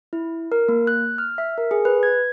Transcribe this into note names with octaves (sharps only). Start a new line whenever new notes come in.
E4
A#4
A#3
F#6
F6
E5
A#4
G#4
B4
G#6